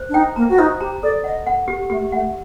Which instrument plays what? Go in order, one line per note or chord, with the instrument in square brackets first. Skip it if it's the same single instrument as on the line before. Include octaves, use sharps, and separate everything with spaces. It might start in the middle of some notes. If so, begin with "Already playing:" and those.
Already playing: [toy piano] C5
[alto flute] D4
[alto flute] D#4 [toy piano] G5
[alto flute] A#3 [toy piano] A#5
[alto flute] F#4
[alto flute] D#4 [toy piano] C5
[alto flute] G4 [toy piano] A#5
[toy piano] A4 [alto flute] D5
[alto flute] D#5 [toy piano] F#5
[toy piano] F#5
G4
[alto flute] A3 [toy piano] G4
[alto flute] A3 [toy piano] F#5